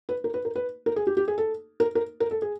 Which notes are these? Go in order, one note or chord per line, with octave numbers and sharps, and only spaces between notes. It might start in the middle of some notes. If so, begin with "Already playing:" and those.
B4
A#4
B4
A#4
B4
A#4
G#4
G4
G4
G#4
A4
A#4
A#4
A#4
A4
G#4